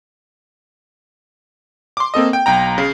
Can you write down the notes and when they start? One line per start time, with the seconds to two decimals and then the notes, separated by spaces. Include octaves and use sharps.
1.97 C6 D6
2.14 A#3 C4 A4 D#5
2.33 G5
2.46 B1 G5 A#5
2.78 C#3